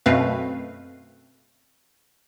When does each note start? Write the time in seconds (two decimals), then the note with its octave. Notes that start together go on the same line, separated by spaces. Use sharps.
0.06 F#2 B2 A3 C4 B4 F5